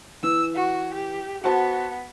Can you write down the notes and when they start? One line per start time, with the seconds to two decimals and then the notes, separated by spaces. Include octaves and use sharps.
0.23 E3 E6
0.55 F#4
0.94 G4
1.44 B3 F#4 C5 A5